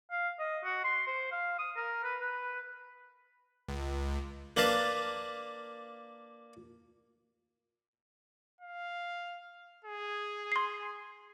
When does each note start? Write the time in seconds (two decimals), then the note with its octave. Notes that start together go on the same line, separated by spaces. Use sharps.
0.11 F5
0.39 D#5
0.64 F#4
0.84 C6
1.07 C5
1.32 F5
1.59 D#6
1.76 A#4
2.04 B4
2.21 B4
3.68 C#2
4.57 A#3 D4 B4 F5 A5
8.61 F5
9.85 G#4
10.52 C6 C7